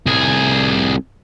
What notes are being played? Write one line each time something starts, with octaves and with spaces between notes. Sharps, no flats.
C2 G#4